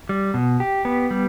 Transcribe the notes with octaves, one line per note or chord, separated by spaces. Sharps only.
G3
B2
G4
B3
G3